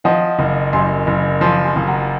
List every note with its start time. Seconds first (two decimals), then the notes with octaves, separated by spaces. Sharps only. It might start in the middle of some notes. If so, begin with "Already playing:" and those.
0.04 F3 D#5 F#5
0.39 F#1
0.73 F#2 G#5 C6
1.07 F#1
1.41 F3 G#5 C6
1.64 G#5 C6
1.76 F#1
1.87 F#5 A#5